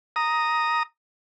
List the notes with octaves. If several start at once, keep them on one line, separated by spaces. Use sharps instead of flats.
A#5 D#6